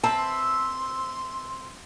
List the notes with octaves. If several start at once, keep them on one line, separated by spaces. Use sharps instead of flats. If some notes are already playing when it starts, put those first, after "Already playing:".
C4 B4 E5 A5
C6